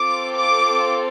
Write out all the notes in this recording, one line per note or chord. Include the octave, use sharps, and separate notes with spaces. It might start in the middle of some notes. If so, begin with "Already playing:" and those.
Already playing: C4 F4 A4 D6
D6